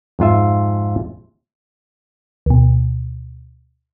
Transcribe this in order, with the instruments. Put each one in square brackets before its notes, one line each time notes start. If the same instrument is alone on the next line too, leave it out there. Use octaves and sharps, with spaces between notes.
[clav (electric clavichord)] F2 G#2 F4 E5
[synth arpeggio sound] D2 B2